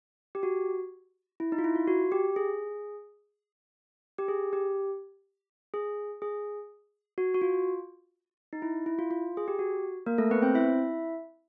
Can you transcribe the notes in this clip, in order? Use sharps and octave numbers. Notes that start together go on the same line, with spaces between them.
G4
F#4
E4
D#4
F4
E4
F4
F#4
G4
G#4
G4
G#4
G4
G#4
G#4
F#4
F#4
F4
D#4
E4
E4
F4
F4
G#4
G4
F#4
A#3 A#4
A3 A4
B3 B4
C4 C5
E4 E5